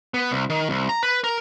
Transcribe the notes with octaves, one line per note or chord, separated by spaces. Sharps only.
B3
C2
D#3
C2
A#5
B4
A#4